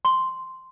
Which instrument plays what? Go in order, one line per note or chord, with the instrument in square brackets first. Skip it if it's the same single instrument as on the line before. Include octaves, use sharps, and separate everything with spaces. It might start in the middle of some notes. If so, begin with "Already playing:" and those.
[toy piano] C6